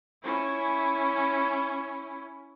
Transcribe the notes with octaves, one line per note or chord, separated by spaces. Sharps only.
C#4 E4